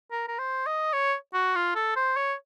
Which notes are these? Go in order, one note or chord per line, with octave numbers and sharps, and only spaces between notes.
A#4
A#4
C5
D#5
C#5
F#4
F4
A4
C5
C#5